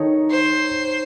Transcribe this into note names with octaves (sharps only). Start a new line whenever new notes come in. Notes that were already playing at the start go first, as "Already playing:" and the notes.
Already playing: D#3 D#4 A4 C#5
C5